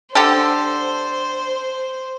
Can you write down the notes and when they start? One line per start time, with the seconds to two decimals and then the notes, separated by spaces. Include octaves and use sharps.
0.15 D3 G4 A4 C5